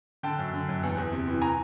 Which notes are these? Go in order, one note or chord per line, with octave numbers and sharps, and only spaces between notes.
D3 G5 A5
F#2
D3
F#2
E2
E2
C3
E3
E3 G#5 A#5